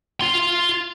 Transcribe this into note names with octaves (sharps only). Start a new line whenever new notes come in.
F4 C6